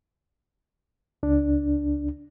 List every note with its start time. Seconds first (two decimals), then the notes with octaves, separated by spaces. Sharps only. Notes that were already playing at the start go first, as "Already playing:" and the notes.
1.23 C#2 D4